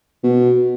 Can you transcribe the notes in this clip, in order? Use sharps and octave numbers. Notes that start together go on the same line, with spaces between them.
B2